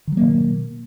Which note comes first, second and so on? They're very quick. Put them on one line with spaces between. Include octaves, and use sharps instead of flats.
D#3 F#3 A#3 B2